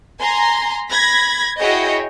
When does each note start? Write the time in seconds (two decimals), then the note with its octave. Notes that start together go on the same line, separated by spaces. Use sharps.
0.21 G#5 A#5 C6
0.91 B5 G#6 A#6
1.59 E4 F#4 G#4 C#5 D#5 G5